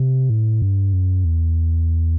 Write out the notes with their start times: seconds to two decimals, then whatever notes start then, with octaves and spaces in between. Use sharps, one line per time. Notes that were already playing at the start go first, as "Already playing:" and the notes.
Already playing: C3
0.30 A2
0.62 G2
0.93 F#2
1.25 E2